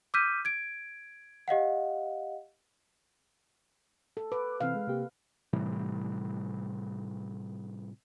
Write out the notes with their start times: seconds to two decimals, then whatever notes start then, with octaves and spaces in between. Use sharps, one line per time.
0.14 D6 E6 F6 G6 B6 D#7
0.45 G#6 D7
1.48 G4 D#5 F5 F#5
4.17 A4
4.32 B4 D6
4.61 C3 E3 C4 F5
4.75 G#3
4.87 C3 A#3 G4
5.53 A2 C3 E3 G3